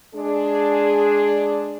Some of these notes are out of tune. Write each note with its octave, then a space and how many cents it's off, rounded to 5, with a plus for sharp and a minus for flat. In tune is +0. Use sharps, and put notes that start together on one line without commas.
G#3 +15 D4 +0 G#4 +0